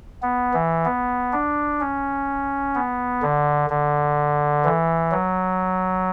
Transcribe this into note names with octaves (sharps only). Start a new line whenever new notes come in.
B3
E3
B3
D4
C#4
B3
D3
D3
E3
F#3